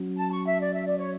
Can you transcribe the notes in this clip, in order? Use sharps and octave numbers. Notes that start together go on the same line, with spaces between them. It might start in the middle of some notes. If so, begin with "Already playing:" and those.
Already playing: F#3 C#4 F#4
A5
C#6
E5
D5
E5
D5
C#5